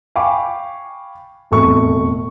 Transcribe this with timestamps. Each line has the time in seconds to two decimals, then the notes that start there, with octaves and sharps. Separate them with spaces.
0.16 F5 G5 G#5 B5 C#6 D6
1.51 E1 F2 A2 A3 C#6